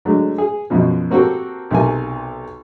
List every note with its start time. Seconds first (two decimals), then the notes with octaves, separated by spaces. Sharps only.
0.05 D3 F#3 G#3 A3
0.38 G#4
0.70 F#2 B2 F3
1.11 A#3 C4 F#4 G4 A4 A#4
1.71 B1 C3 A#4 G#5